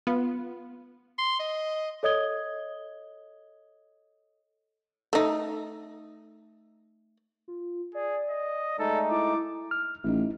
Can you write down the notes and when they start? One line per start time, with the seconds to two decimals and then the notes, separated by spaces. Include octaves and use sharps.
0.07 B3 F4
1.19 C6
1.39 D#5
2.03 A4 C#5 D#5 D#6 G#6 G7
5.13 A3 D#4
7.48 F4
7.95 G#4 D5
8.30 D#5
8.79 G#3 A3 D#4 A4
9.11 E4 D6
9.71 F6
10.04 A1 D#4 E4